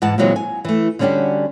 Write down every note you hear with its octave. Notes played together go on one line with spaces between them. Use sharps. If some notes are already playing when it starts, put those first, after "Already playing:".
G#2 E3 F#5 A5
A#2 D3 E3 F#3 G#3 C4
G#5
E3 A3
D3 G3 C#4 D4 F#4 G4